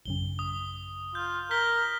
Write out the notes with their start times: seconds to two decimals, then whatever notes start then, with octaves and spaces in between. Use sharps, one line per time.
0.05 A1 F#2 C#3 G7
0.39 D#6
1.15 F4 G6
1.51 A#4 G6 B6 G7